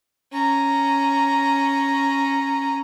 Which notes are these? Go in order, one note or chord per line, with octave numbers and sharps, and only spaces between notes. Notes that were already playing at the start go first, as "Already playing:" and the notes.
C#4 A#5